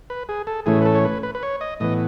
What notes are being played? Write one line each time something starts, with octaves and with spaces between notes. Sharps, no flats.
B4
G#4
A4
A2 E3 A3 C#4 G#4
B4
A4
C#5
B4
B4
B4
C#5
D#5
A2 E3 B3 D#5